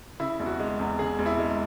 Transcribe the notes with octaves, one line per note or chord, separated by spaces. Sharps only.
C#3 E4
E1
F#4
G#3
E2
C#3 G#4
E1
E4
G#3